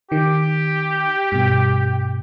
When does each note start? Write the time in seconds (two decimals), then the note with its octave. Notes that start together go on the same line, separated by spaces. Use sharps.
0.12 D#3 G4
1.32 G2 B2